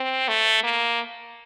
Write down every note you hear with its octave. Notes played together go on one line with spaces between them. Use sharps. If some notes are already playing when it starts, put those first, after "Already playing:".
Already playing: C4
A3
A#3